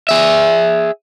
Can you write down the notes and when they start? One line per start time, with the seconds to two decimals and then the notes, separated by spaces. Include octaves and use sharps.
0.09 G#4 E5